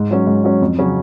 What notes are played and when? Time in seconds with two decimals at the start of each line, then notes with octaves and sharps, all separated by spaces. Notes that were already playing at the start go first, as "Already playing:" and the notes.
Already playing: G#2
0.11 F#3 C#4
0.27 G#2
0.44 F#3 C#4
0.61 F2
0.78 C#3 F#3 C#4